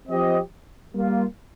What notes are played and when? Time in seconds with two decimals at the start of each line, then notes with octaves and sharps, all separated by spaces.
0.08 F3 C4 G4 C5 D#5
0.94 G3 A#3 F4